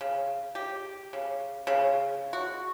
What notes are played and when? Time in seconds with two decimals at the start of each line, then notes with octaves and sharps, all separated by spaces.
0.01 C#3
0.55 G4
1.13 C#3
1.67 C#3
2.33 F#4